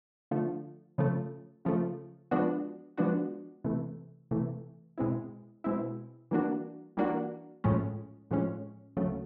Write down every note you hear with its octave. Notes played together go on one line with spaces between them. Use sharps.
D3 F3 A3
C#3 F3 A3
C#3 F3 A3
F3 G#3 B3 D4 F#4
F3 G#3 B3 D4 F#4
C3 E3 A3
C3 E3 A3
B2 G#3 C4 E4
B2 G#3 C4 E4
E3 G3 A#3 D4 F#4
E3 G3 A#3 D4 F#4
A2 F3 G#3 C#4
A2 F3 G#3 C#4
D2 C#3 F#3 A3